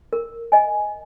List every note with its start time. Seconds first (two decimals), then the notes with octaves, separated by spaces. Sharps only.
0.13 A#4
0.52 D#5 G#5